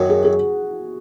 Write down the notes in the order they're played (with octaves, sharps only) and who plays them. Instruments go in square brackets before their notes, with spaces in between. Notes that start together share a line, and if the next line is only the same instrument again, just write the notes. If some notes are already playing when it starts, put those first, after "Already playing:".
Already playing: [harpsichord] F#2 D#3 F#3 [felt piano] F#4
[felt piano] G#4
G#4